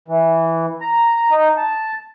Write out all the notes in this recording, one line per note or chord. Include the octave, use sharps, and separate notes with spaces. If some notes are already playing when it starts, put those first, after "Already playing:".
E3
A#5
D#4
A5